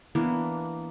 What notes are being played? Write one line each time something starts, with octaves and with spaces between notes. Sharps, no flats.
E3 A#3 B3 D4